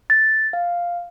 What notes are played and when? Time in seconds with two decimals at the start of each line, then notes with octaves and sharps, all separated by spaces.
0.10 A6
0.53 F5